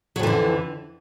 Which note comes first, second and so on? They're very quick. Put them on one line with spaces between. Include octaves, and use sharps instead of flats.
F#3 F2 E3 D3